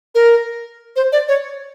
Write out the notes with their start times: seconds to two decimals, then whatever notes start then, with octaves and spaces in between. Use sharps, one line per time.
0.15 A#4
0.96 C5
1.12 D5
1.28 C#5